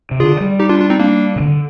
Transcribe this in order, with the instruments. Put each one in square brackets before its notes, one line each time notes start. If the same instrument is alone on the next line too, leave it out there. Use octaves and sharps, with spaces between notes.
[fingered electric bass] C3
[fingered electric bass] D3 [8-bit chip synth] F4 G#4
[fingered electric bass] G3
[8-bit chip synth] D#4 G4
D4 F4
D4 F4
C4 D#4
A#3 D4
[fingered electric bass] C3
D3